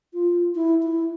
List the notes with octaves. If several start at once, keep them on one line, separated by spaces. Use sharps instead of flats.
F4
E4
E4